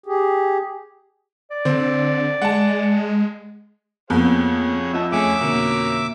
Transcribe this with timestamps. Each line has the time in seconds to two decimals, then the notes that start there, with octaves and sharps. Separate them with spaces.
0.06 G4 G#4
1.51 D5
1.65 D3 C4
2.42 G#3 F#5 A5
4.10 F2 A#3 B3 G#4 C#5 F#5
4.93 C4 F4 D#5 E5 F#5 A5
5.12 E2 A3 C#4 G#4 E5 G#5 D6
5.41 B2 D3 A#3 C#4 F#4 A#4